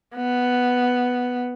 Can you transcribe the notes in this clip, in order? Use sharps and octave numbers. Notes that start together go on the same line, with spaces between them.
B3